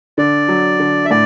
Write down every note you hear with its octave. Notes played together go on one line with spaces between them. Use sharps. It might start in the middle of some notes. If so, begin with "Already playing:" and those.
D3 D5
F#3
D3
E5
A2 D5